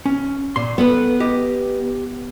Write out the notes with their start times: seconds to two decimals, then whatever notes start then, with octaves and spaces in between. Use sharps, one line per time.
0.06 C#4
0.56 A#2 C6
0.78 B3 A4 B4
1.20 G4 D#5